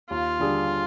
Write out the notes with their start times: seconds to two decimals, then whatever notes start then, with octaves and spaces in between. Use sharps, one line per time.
0.10 D#2 F4
0.40 D3 G3 D4 G#4